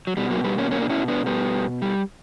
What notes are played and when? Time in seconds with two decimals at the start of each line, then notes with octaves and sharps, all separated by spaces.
0.07 F#3
0.17 B2 G3
0.30 F#3 A#3
0.44 G3 B3
0.58 A#3 C#4
0.71 A#3 C#4
0.82 D4
0.90 C#4 E4
1.08 B3 D4
1.26 G3 B3
1.82 G3